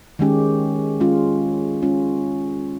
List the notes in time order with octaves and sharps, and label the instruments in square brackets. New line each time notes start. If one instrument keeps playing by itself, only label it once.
[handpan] D#3 G#3 C#4 G4
G#3 C#4 F4
G#3 C#4 F4